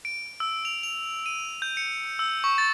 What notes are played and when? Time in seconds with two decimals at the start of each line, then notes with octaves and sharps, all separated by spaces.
0.05 D7
0.40 E6
0.65 F7
0.83 F7
1.26 D#7
1.62 G6
1.77 C#7
2.19 E6
2.44 C#6
2.58 A6